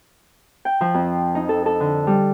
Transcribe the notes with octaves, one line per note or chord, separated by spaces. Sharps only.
G5
F3
F2
D#4
A4
A4
D3
G3